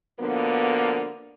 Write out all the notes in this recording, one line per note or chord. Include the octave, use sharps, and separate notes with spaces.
B2 D3 F3 A#3 B3